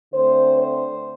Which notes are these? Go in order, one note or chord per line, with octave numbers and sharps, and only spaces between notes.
D3 A3 C4 C5
C5